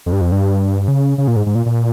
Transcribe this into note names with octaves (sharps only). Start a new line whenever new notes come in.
F2
G2
F2
G2
C#3
C#3
A#2
G#2
G#2
A#2
A#2